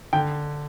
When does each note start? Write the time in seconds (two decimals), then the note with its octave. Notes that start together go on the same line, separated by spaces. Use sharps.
0.13 D3 G5